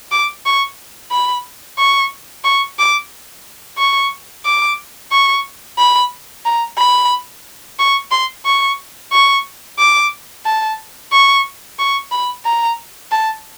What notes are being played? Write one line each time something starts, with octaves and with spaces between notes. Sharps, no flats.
D6
C#6
B5
C#6
C#6
D6
C#6
D6
C#6
B5
A#5
B5
C#6
C6
C#6
C#6
D6
A5
C#6
C#6
B5
A#5
A5